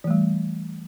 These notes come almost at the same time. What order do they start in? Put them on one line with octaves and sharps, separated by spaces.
E3 A3 G3